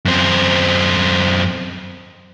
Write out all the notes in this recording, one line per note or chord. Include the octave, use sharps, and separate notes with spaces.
F#2 C4